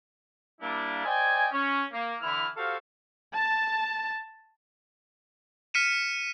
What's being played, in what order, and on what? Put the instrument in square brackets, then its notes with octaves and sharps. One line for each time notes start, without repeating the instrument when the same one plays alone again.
[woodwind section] G3 A#3 D4 E4
C5 D5 D#5 G5 G#5
C#4
A#3
D3 E3 E4 F6
F#4 G4 A4 C5 F5
[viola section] A5
[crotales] F6 B6 C#7 D#7 E7